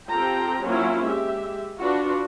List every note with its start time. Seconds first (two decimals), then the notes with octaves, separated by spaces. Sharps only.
0.10 C4 F4 G4 A4 G5 A#5
0.63 F#3 A#3 C4 C#4 E4 F4
1.05 G#3 G4 E5
1.82 D4 F4 F#4 B4